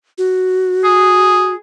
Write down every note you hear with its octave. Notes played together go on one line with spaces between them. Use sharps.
F#4
G#4